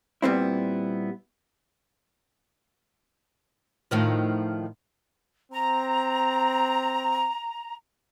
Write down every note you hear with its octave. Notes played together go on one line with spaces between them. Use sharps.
A#2 G3 B3 C4 E4
A2 D#3 F3
C4 A#5